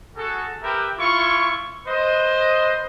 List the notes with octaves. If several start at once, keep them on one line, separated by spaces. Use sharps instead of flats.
F#4 G#4 A4
G4 A#4 B4 E5 G5
E4 F4 C#6
B4 C5 D#5